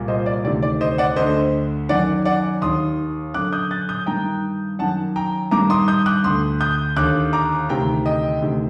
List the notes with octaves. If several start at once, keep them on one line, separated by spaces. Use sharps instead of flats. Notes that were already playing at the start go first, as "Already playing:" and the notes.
Already playing: C2 A#2
C5 D#5
D5
D2 C3 D#3 D5
D5
C5 D#5
D5 F#5
D2 D3 C5 D#5
F#2 D#3 D5 F#5
D5 F#5
D#2 D#3 C6 D#6
F#2 D3 D6 F#6
D#6 G6
F#6 A6
D#6 G6
G2 D#3 G5 A#5
F#2 D#3 F#5 A5
G5 A#5
G2 D#3 A#5 D6
C6 D#6
D#6 G6
D6 F#6
D2 D3 C6 D#6
D#6 G6
D#2 D3 D6 F#6
A#5 D6
D2 C3 D#3 G5 A#5
D#5 G5
D2 C3 D#3